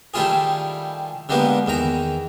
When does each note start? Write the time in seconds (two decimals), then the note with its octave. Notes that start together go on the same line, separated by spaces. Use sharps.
0.14 D#3 G3 A3 E4 F4 G#4
1.29 D3 G3 G#3 A#3 B3
1.66 E2 D#3 A#5